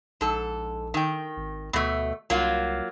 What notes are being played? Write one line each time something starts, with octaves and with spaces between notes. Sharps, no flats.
A#1 G#2 A4
D#3 G5
G#1
D2 B2 A3
C2 F#3 A#3 F4